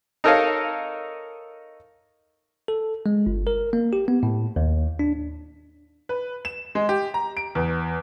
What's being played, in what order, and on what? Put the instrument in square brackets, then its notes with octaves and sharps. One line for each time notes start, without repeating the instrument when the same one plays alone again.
[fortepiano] D#4 A4 A#4 C#5 D#5 F5
[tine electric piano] A4
G#3
G1
A#4
A#3
G4
B3
A2
D#2
D4
[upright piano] B4
E7
G#3
G4
A#5
D7
E2